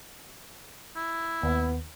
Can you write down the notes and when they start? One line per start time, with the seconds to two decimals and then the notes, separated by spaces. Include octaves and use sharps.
0.96 E4
1.43 D#2 B3